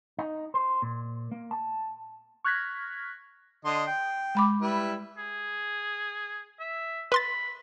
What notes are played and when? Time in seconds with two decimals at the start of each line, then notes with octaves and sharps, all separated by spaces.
0.19 D#4
0.54 C5
0.82 A#2
1.31 A#3
1.51 A5
2.44 C#6 F6 F#6 G#6 A#6 B6
3.65 D3 D#5 C6
3.87 G5
4.35 G#3 B5 D6
4.61 G3 E4 B4
5.18 G#4
6.60 E5
7.12 B4 B5 C6 A6